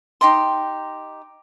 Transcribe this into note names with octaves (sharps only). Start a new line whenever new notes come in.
D#4 G4 D#5 C6